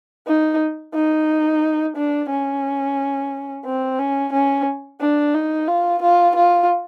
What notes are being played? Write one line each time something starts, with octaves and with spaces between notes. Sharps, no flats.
D#4
D#4
D4
C#4
C4
C#4
C#4
D4
D#4
F4
F4
F4